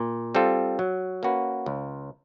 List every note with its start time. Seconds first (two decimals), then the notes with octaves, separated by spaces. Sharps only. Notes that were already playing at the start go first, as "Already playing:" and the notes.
Already playing: A#2
0.35 G3 C4 F4 A4
0.79 F#3
1.23 A#3 C#4 F#4 B4
1.66 C#2